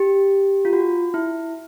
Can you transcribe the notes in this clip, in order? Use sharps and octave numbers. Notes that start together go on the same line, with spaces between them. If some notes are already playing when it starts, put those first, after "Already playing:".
Already playing: G4
F4
F#4
E4